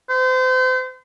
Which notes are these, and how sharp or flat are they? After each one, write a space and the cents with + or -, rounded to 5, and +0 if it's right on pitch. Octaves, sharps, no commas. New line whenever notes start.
C5 -35